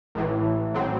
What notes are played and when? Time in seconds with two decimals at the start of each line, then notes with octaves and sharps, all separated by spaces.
0.15 A1 A2 E3
0.74 A1 A2 F#3 C4